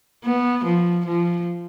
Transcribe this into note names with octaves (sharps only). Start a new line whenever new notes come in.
B3
F3
F3